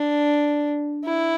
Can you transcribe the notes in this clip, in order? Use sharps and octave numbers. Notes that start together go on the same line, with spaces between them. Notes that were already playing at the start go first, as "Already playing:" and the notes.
Already playing: D4
E4